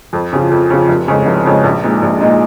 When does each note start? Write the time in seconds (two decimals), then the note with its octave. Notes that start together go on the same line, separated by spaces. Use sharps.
0.13 F2
0.33 C#3 F3
0.51 F2
0.70 C#3 F3
0.89 F1
1.08 F2 C#3 G#3 C#4
1.26 F1
1.46 F2 C#3 G#3 C#4
1.64 A#1
1.83 A#2 G#3 D#4
2.02 A#1
2.20 A#2 G#3 D#4